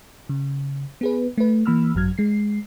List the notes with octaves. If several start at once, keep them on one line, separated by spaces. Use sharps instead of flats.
C#3
B3 G#4 B4
A3 B4
E3 A#3 B5 E6 F6
G#1 F#2 F#3 F6 G#6
G#3 C7